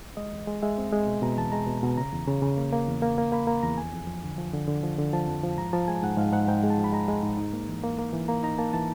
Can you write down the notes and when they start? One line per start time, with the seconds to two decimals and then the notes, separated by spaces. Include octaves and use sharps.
0.17 G#3 D#5
0.32 E2
0.47 G#3
0.62 G#3 E5
0.78 C4
0.92 G#3
1.07 B2
1.22 B2 A#5
1.37 E2 A5
1.52 G#3 A#5
1.67 B2
1.82 B2
1.97 C#3 A#5
2.13 E2
2.27 C#3
2.42 C#3
2.58 A#3
2.73 A#3
2.88 E2
3.02 A#3
3.18 A#3
3.32 A#3 B5
3.47 A#3 A#5
3.63 E2 A#5
3.77 F2 G#5
3.93 F2
4.07 F3
4.23 D3
4.38 F3
4.53 D3
4.68 D3
4.83 F3
4.98 D3
5.13 F3 A5
5.28 F2
5.43 F3
5.57 G#2 A#5
5.73 F3 A5
5.88 G#3 G#5
6.03 G#2 F#5
6.17 G#2 F5
6.32 G#2 F#5
6.48 G#2 G5
6.64 G#3
6.70 A5
6.78 F3
6.84 B5
6.93 G#3 A#5
7.08 G#3
7.23 G#2
7.38 D#4
7.53 A#3
7.68 E3
7.84 A#3
7.99 A#3
8.13 E3
8.28 A#3 A#5
8.44 D#4 A#5
8.58 A#3 A5
8.73 E3 A5